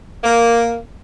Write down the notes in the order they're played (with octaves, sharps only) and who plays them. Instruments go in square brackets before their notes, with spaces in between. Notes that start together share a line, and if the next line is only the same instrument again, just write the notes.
[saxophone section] A#3